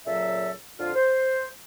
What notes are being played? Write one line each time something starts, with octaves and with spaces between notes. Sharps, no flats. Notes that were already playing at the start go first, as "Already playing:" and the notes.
A#2 C#3 F#3 A4 E5
F2 D3 F4
C5